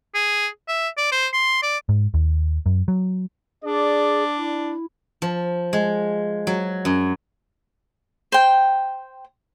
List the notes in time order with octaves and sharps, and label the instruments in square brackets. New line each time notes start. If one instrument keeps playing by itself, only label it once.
[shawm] G#4
E5
D5
C5
C6
D5
[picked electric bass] G#2
D#2
F#2
F#3
[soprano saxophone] D4 [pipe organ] G#4 [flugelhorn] D5
[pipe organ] E4
[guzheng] F3
G#3
F#3
F#2
[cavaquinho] C5 G5